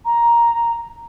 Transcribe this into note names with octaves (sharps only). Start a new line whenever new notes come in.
A#5